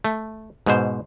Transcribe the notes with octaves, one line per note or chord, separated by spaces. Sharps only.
A3
G#2 B2 C5